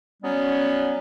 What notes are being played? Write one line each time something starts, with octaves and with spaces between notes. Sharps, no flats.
F#3 G3 B3 C#4